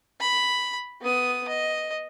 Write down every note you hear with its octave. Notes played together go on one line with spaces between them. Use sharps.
B5
B3 D#6
D#5